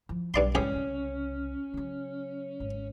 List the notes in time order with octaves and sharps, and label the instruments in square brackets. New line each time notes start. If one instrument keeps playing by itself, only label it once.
[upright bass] F3 E4
[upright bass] B1 [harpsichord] G2 D5 C6
[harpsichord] A1 G4 G#4 [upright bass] G#2 C#3 [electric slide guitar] C#4
[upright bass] C2 C#3
C#3 F#3
G#1